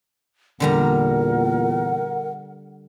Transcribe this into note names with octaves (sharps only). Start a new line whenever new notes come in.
E2 A#2 D3 G3 A#4 F#5 A#5